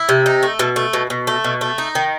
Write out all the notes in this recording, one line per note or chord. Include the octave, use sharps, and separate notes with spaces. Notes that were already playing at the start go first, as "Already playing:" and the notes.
Already playing: E4
C3
D#4
A3
B2
A3
B2
B2
A3
B2
A3
D#4
D#3